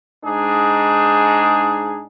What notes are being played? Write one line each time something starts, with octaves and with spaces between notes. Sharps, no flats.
G#2 D4 D#4 G#4